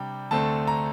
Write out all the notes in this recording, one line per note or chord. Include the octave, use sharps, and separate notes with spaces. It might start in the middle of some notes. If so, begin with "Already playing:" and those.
Already playing: C3 G3 D4 G5
D2 D3 A3 C4 A5
A#5